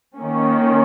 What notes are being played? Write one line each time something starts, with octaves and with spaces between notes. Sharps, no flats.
D#3 A#3 C#4